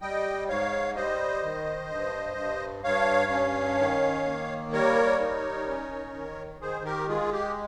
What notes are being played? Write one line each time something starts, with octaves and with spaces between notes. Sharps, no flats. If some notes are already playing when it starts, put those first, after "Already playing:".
G3 D#5 G5
G#2 C#5 F5
G3 C5 D#5
D#3
G2
G2
G2 C#5 F5
C#4
D#3
A#3
G3 A#4 C#5
D#4
C#4
D#3
D#3 G#4 C5
G4 A#4
G#3 F4 G#4
G4